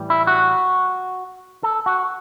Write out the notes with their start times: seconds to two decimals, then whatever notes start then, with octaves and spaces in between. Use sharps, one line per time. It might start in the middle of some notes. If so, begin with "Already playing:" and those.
Already playing: A2 E3 G3
0.10 E4
0.27 F#4
1.63 A4
1.86 F#4